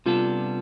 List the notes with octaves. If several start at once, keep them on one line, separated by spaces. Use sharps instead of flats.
C3 G3 B3 D4 F4 A4